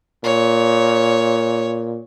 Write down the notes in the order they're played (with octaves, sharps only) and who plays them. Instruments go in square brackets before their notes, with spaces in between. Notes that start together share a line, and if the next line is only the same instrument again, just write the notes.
[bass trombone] A#2 [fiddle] C#5